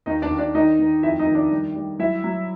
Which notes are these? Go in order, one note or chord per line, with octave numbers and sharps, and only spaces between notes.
D#2 D#4 D#5
D4 D5
D#2
D4 D5
D#3 D#4 D#5
D#3
F2 E4 E5
D#4 D#5
D#3
D4 D5
G3
G3
F#3 E4 E5
F#3